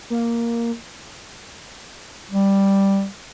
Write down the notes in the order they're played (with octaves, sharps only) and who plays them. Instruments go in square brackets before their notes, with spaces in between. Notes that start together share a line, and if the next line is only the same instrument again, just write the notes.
[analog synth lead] A#3
[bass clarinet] G3